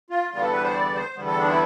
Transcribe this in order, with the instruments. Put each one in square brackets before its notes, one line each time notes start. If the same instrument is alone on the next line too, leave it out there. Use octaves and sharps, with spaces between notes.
[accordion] F4
E2 D3 G3 B3 F4
A4
B4
C5
D5
C5
E2 D3 G3 B3
A4
D4
E4